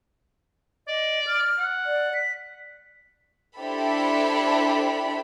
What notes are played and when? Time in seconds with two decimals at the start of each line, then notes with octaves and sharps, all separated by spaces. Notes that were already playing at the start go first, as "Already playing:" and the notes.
0.88 D5 D#5
1.27 F6
1.58 F#5
1.86 D5
2.14 B6
3.59 D4 E4 G4 A4 C5 B5